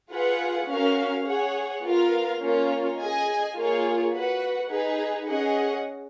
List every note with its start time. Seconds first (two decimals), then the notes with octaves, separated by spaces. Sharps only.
0.11 F4 G#4 B4 F#5
0.68 C#4 F#4 A#4 F5
1.25 G#4 C#5 F#5
1.83 B3 F4 A#4 F5
2.40 A#3 C#4 F4 A#4
2.99 G#4 D#5 G#5
3.56 A#3 F4 G#4 C#5
4.13 F#4 B4 F#5
4.70 D#4 G#4 B4
5.28 C#4 G#4 D#5 F#5